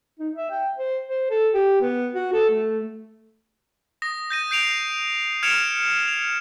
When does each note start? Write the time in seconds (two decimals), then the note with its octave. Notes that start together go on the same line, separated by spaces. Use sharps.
0.19 D#4
0.35 E5
0.51 G5
0.78 C5
1.08 C5
1.30 A4
1.54 G4
1.81 B3
2.15 F#4
2.33 A4
2.50 A3
4.02 D#6 A#6
4.30 G6 A#6 D#7
4.51 G6 C7 D7 F7
5.43 F6 G#6 C#7 D7 E7 F7
6.07 F7